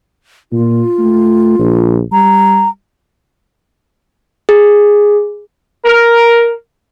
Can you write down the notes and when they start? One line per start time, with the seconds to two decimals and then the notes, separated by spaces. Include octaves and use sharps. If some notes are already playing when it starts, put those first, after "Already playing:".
0.52 A#2 F4
0.99 A3
1.59 A#1
2.12 G3 A#5
4.49 G#4
5.85 A#4